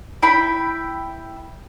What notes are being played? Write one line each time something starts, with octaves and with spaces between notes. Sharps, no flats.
E4 G5 B5